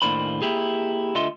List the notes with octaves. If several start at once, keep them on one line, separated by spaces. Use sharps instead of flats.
D#2 A2 A#3 D4 C5 B5
A#3 E4 G4 G#4
D2 D3 F4 D#5 E5 C6